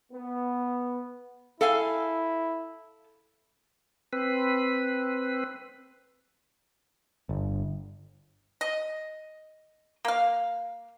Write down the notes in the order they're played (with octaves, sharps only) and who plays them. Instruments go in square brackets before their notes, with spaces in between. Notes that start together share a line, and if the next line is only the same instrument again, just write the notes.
[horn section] B3
[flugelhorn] E4 [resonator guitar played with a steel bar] A4 F5 G#5
[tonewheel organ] C4 B4
[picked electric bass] G1
[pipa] D#5
A#3 F5